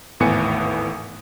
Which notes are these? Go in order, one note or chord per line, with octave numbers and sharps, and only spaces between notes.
G#1 E2 A2 B3 G#5 C#7